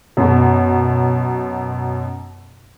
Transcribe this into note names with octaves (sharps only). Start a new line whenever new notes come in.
F#2 B2